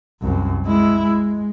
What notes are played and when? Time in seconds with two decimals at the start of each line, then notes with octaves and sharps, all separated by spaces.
0.22 C2 F#2
0.65 G#3 E4
1.02 G#3